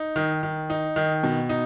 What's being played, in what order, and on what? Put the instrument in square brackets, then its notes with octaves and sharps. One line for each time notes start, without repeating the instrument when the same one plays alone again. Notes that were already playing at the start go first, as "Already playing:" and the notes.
Already playing: [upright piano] D#4
D#3
D#3
D#4
D#3
B2
D#4